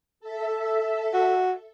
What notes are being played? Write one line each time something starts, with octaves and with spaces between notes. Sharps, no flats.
A4 E5
F#4